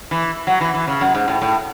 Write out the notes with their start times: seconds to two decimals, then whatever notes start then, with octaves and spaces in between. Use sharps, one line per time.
0.11 E3
0.47 F#3
0.61 E3
0.74 E3
0.87 C#3
1.01 F#2
1.15 G#2
1.28 A2
1.42 A2